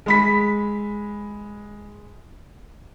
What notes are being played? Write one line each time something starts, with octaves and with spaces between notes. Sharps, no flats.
G#3 B5 B6